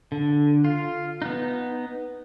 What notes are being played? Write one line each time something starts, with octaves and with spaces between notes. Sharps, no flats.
D3
F4
B3 D#4